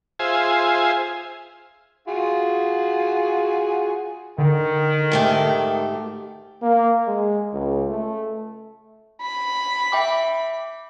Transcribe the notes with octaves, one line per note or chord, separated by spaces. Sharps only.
F4 G#4 C5 E5 G#5
F4 F#4 G#4
D3 D#3
G#2 A3 G4
A#3
G#3
C#2
A3
B5
E5 G5 D6